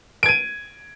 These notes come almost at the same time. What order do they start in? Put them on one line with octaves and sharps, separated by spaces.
D7 G#6 D#7